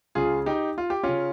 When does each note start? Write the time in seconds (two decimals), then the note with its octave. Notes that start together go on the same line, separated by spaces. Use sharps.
0.15 C#2 C#3 F4 G#4
0.46 D#4 G4
0.78 F4
0.90 G4
1.03 C#4 F4
1.09 C#3